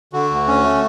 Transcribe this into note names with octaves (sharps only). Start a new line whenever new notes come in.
D3 F#4
D2
C#4
A3